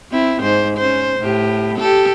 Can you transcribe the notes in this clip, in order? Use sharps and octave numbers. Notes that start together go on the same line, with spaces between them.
C4 E4
G#2 C5
C#4 C5
A2 G4
G4 A4